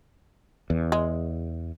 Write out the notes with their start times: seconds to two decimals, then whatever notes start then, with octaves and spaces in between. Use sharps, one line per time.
0.70 E2
0.92 G#3